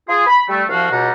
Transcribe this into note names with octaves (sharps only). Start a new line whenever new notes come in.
F4 G#4
B5
G3 A3
C2 F3 F#4 F5
C#2 B2 G3 F#5 A#5